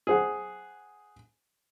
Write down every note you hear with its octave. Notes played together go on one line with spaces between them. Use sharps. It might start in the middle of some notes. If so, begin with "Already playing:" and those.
G#4 C5 F#5